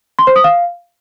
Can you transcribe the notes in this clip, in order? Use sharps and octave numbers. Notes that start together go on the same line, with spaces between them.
C6
C5
D#6
F5